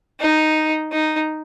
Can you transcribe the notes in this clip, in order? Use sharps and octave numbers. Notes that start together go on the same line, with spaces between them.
D#4
D#4